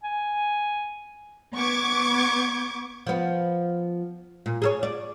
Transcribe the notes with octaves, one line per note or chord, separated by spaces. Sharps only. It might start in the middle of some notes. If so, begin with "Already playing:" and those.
G#5
B3 C#6 D6 G#6
F3 B3
A#2
G#4 A4 C#5
D5